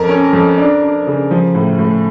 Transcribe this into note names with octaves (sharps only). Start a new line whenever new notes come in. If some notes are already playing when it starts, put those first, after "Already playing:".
Already playing: F2 A#4
C#4
F2
D4
D4
C#3
F3
A2
A2